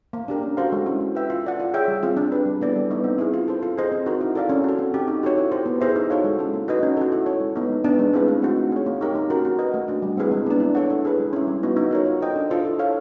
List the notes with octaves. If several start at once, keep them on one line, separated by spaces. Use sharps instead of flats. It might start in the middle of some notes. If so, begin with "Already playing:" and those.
A#3
D4 G4 A#4
C#4
F#4 A4 C5 F5
G#3
C#4 E4
F#4
B4 E5 G5
F4
A4 D5 F#5
F4
G#4 C#5 E5 G5
G3
C4 F4 G#4
D4
G4 B4
G3
B3 E4 A4 D5
G3
B3 D#4
C4
E4 G#4
F4
A4 C5
F4
G#4 C5 D#5
C4
D#4 F#4 A#4
E4
A4 D5 F5
C#4
F#4 A4
C4
D#4 G4
D#4
F#4 A4 C#5
E4
G4 C5
B3
E4 G#4 C5 E5
D#4
F#4 A4 C#5 F5
G#3
C#4 E4 A4
A#3
D#4 F#4 B4 D#5
C#4
F#4 A4
E4
A4 C#5
G#3
B3 D#4
G#3
B3 D4
G#3
C4 E4 G#4 B4
A3
C4 D#4 F#4
F4
G#4 C#5
A#3
D#4 G4 A#4 C#5
A#3
C#4 F#4 A#4
F#4
B4 D#5 F#5
A3
D4 F#4
G3
C4 E4 G#4 B4
G#3
B3 D4
E4
A4 C#5 F#5
E4
G#4 B4
G#3
C#4 E4
G3
B3 D#4 F#4
D#4
F#4 A#4 C#5
F4
A4 C5 D#5 G5
D4
F4 A4 C5
E4
A4 C#5 F5